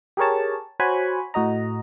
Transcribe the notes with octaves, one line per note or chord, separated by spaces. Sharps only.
G4 G#4 A#4 C#5 A5
F#4 C5 C#5 F#5 G#5 B5
A2 F#4 D#5 A#5